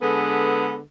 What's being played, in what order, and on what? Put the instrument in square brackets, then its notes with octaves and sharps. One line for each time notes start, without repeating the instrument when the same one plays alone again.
[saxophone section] D3 G#3 B3 G#4 A4 B4